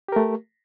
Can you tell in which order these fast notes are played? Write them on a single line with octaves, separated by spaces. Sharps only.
G4 A#4 A3